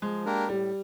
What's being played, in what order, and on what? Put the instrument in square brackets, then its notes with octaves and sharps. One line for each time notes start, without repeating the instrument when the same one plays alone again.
[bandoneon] F3 [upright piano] G#3
[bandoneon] A#3 D4 G4 A#4
[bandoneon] A2 [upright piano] G3